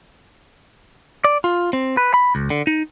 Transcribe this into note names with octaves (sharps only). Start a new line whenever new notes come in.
D5
F4
C4
B4
B5
C#2
D3
D#4